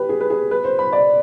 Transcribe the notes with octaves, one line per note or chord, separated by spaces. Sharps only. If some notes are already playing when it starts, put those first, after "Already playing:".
Already playing: G4 B4
G#4
B4
G#4
B4
C5
B5
D5